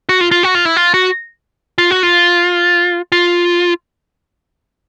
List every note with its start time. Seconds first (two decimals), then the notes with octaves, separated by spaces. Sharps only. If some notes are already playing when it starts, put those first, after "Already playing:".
0.09 F#4
0.21 F4
0.31 F4
0.43 F#4
0.55 F4
0.65 E4
0.77 F4
0.94 F#4
1.78 F4
1.91 F#4
2.03 F4
3.12 F4